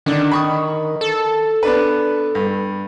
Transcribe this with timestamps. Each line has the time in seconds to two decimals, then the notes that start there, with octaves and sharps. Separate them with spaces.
0.06 D3 D#3 D4
0.31 B5 C#6 D#6
1.01 A4
1.63 B3 D4 B4
2.35 G2